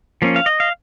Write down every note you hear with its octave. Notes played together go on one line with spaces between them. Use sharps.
F3 A#3 C#4
F5
D#5
F5